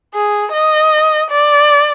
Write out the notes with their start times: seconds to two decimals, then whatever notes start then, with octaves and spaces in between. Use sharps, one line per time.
0.14 G#4
0.53 D#5
1.30 D5